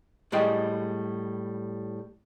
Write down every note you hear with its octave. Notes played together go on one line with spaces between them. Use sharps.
A2 G3 G#3 G4 G#4 G5